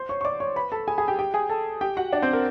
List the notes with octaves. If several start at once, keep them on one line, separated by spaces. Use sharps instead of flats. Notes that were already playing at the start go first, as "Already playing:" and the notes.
Already playing: C5 C6
C#5 C#6
C#6
D5 D6
C#5 C#6
B4 B5
A4 A5
G#4 G#5
G#4 G#5
G4 G5
G4 G5
G#4 G#5
A4 A5
G4 G5
F#4 F#5
D4 D5
C4 C5
A#4